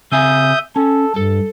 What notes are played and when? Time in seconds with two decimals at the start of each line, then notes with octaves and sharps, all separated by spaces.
0.12 C#3 C4 E5 G#5 D#6 G6
0.76 C#4 A4
1.16 G2 A4